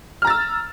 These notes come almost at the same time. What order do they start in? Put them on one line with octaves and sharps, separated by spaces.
F6 A#5 A6 E6